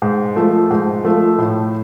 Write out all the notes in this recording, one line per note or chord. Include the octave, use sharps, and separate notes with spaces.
G#2
F3 A3
G#2
F3 A3
A2